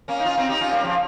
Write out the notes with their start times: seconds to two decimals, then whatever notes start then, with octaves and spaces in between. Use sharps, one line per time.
0.08 A#3 C#4
0.20 D#4
0.25 C#4 F4
0.38 C4 D#4
0.49 D#4 G4
0.61 C#4 F4
0.72 G3 A#3
0.84 C#3 F3